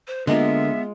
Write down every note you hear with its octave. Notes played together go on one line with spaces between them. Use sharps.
C5
D3 G#3 A#3 B3 F4 E5